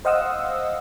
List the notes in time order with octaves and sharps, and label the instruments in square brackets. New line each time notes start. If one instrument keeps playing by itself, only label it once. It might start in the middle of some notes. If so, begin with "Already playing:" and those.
[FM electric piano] C5 D#5 F5 F#5 D#6 E6